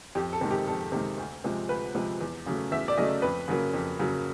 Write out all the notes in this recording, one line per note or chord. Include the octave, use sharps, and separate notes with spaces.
F2 G4
A4
C3 D#3 G#3
G4
F2 A4
C3 D#3 G#3
D2
C3 F3 G#3
D2 B4
C3 F3 G#3
E2
C#3 F#3 A3
E2 E5
D5
C#3 F#3 A3 D#5
F2 B4
C#3 F#3 A#3
F2
C#3 F#3 A#3